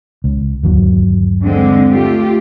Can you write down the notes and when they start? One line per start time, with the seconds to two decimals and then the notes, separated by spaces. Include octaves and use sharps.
0.24 C#2
0.63 G1 D#2 F#3
1.42 D3 G#3 C4
1.90 A3 F4 G4